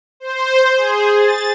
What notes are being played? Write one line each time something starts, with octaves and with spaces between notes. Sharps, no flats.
C5
G#4
A6